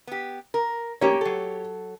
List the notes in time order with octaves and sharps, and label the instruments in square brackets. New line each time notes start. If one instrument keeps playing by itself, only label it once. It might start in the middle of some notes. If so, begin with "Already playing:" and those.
[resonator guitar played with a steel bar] B3 G4
A#4
[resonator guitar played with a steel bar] A#3 C#4 [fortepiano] G4 C#5
[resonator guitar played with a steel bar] F#3 A4